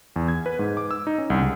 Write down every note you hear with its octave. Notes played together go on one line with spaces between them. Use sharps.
E2
G#6
B4
G#2
D6
E6
D#4
C#4
C2
C#2